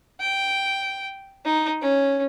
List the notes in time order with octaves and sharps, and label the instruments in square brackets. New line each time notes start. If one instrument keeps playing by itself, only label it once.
[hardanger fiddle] G5
D#4
C#4